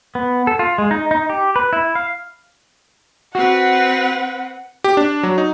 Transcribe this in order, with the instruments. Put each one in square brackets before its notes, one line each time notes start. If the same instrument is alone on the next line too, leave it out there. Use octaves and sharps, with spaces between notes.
[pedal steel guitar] B3
A4
F4
G#3
D#4
D#4
G4
B4
E4
F5
[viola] C4 B4 [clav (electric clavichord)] F#4 [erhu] F#5
[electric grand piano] G4
D4
F#3
D#4